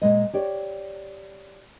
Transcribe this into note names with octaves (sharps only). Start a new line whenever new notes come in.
A#2 G#3 D#5
G4 C#5 D5